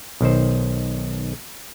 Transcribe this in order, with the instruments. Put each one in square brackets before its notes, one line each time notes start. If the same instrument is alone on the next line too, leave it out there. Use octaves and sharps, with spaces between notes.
[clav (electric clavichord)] B1 D#3 C5